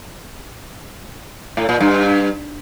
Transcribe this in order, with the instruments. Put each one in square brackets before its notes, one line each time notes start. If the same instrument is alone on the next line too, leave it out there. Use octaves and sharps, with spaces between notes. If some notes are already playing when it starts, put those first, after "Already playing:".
[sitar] A2
A#2
G2